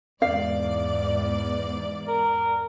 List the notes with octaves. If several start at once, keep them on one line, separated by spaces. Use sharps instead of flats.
E2 G#2 D5 F5
A#4